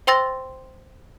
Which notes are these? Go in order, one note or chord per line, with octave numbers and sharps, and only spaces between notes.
C5 G5 C6 E6 A6 A#6